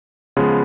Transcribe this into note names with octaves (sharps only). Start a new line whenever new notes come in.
C#3 F3 G#3 B3